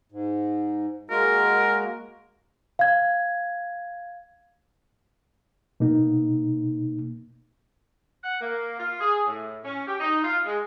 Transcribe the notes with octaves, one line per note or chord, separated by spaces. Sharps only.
G#2
G#3 A#3 F#4 A#4
F5 G#6
B2 A#3 D#4
F#5
A#3
F4
G#4
A2
C#4
G4
D#4
F4
G#3